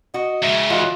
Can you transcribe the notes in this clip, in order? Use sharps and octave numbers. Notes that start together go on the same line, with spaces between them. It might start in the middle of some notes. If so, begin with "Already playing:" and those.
F#4 D#5
G#2 C#3 E5
E3 F4 F#4 D#5